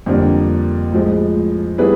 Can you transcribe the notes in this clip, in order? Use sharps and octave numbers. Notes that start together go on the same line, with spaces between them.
F2 D3 G3 A#3 D4
A2 F3 G#3
G3 B3 E4 G#4 B4